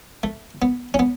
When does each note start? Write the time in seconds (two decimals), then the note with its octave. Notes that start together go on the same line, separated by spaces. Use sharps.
0.23 A3
0.62 B3
0.94 C#4
0.99 B3